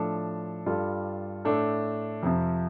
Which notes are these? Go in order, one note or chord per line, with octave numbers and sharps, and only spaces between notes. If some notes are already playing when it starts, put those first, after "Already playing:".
Already playing: A2 F3 D4 A4
G2 G3 F4 A4
A2 A3 D4 A4
F2 C3 F3